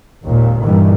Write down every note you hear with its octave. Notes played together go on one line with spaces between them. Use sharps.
G#1 D#2 A#2
G2 A#2 D#3 E3 G3